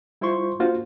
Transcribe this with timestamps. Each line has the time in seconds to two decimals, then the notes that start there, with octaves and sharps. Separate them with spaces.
0.21 G3 E4 F4 C5 C6 C#6
0.59 A#3 D4 F4 F#4 C5